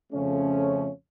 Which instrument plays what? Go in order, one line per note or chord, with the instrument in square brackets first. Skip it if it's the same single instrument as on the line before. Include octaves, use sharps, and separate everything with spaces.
[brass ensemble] F2 C#3 F3 A3 C#4